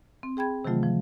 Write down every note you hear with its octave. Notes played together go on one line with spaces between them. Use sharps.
C4
G#4 G5 B5 G#6
C3 D#3 E3 F#3 A3 F4
F3